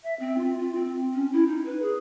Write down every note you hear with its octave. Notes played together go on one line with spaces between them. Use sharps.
E5
C4
F4
F4
C4
C#4
E4
D#4
B4
G#4